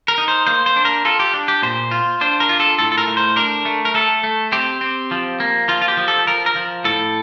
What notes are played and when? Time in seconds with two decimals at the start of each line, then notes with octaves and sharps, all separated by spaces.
0.08 A#4
0.18 D#4
0.28 C5
0.47 A#3 C5
0.66 C5
0.76 D4
0.85 A#4
1.05 F4 A4
1.20 G4
1.34 D4
1.48 G4
1.63 A#2 C5
1.91 F4
2.21 D4 C5
2.40 A#4
2.49 F4
2.60 A4
2.79 A2 A4
2.92 A4
2.98 A#4
3.07 A3
3.17 C5
3.36 D4 A#4
3.65 A3
3.85 A#4
3.94 A3 A4
4.23 A3
4.52 C4 G4
4.81 C4
5.11 F3
5.40 A#3
5.68 F3 F4
5.82 F4
5.88 G4
5.97 F3
6.08 A4
6.27 F3 A#4
6.46 A#4
6.56 F3
6.84 A2 A4